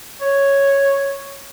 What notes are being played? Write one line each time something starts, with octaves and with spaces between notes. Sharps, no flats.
C#5